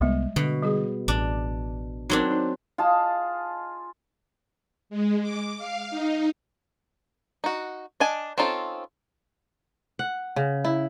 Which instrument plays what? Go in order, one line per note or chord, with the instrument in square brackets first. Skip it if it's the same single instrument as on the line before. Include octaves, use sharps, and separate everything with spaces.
[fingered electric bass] C2 B3 [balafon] G3 G#3
[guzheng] B2 [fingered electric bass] D3
[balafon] G3 G#4
[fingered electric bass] A1 [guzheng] D4
[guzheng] F#3 C4 D4 [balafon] D#4 A#4 C5
[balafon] D#4
[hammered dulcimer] F4 G#4 D#5 A5
[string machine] G#3
D6
F5
D#4
[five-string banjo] D#4 F#4
D4 D#5 G#5 A5
C4 C#4 D#4 F4 A4
[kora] F#5
C#3
E4